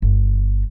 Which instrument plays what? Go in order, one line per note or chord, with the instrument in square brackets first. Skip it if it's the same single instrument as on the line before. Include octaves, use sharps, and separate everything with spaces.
[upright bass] G1